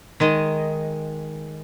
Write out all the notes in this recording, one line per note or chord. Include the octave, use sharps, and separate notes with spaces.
D#3 G#3 D#5